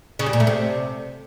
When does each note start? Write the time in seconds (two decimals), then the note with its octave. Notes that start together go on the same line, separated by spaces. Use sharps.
0.19 C#3
0.26 G3
0.33 A#2
0.40 A3
0.47 C3